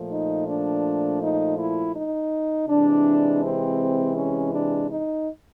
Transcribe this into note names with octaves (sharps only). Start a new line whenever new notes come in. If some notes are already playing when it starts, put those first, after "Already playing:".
Already playing: A#2 F3 A3
D#4
D4
D#4
E4
D#4
C3 E3 G#3 D4
C4
C#4
D4
D#4